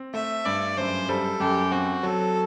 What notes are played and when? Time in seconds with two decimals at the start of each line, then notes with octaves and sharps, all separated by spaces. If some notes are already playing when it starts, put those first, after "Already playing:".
Already playing: C4
0.14 A3 E5
0.45 G2 D5
0.77 F#2 C5
1.09 G3 A4
1.40 F#2 G4
1.72 C4 F#4
2.03 F#3 A4